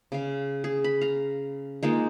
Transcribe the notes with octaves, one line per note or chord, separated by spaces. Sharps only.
C#3 F5
G#4
B5
F5 A#5
G#3 A#3 D#4 F4